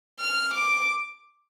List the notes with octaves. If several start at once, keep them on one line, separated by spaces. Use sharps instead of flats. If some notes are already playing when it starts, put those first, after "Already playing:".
F6
D6